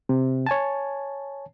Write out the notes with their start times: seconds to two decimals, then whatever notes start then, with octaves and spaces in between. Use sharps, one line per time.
0.09 C3
0.46 C#5 G#5 A5